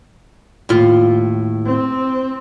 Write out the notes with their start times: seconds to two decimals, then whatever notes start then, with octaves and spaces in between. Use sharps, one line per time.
0.69 D#2 A2 F4
1.66 C4